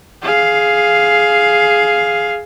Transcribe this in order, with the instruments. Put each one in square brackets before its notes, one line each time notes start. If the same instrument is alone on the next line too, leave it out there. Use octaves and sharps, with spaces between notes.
[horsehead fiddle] G#4 F5